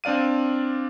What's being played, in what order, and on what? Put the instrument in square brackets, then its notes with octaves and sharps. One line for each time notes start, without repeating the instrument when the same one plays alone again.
[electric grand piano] C4 D4 D5 F5 D#7